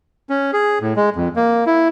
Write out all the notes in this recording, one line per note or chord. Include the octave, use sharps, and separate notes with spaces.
C#4
G#4
A2
G#3
F2
A#3
E4